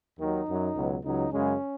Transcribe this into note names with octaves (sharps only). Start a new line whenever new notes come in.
D#2 D#3 F#3 D#4
F#2 F#3
C#2 B2 F#3
C#2 C#3 F#3 D#4
F#2 C#3 G#3 C#4